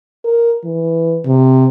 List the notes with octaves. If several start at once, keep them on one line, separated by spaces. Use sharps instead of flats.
A#4
E3
C3